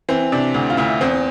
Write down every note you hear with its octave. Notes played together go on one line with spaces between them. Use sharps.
E3 C4
C3 D4
D2
F4
D2 E4
E2 C4